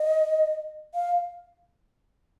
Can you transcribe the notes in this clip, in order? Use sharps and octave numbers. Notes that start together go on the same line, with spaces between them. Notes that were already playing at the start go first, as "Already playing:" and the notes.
Already playing: D#5
F5